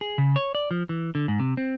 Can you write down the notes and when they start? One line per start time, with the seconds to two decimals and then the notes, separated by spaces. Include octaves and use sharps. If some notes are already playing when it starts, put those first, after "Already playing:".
0.01 G#4
0.18 C#3
0.36 C#5
0.55 D5
0.71 F3
0.89 E3
1.15 D3
1.28 G#2
1.40 C3
1.57 C4